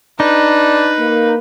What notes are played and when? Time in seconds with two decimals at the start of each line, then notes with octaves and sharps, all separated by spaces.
0.20 D4 D#4 B4
0.99 A#3